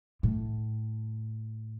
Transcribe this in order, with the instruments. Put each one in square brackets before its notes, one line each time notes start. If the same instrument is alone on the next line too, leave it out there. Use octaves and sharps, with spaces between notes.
[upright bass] A2